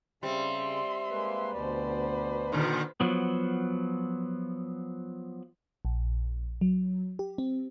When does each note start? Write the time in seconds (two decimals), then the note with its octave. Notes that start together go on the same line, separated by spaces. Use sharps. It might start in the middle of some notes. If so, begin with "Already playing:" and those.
0.23 C#3 G3 C4 E5 C6
1.11 G#3 A#3 B4
1.53 D2 B2 B4 C5 D5
2.52 A#2 D3 D#3
3.00 F3 F#3 B3
5.85 A#1
6.61 F#3
7.19 G4
7.38 C4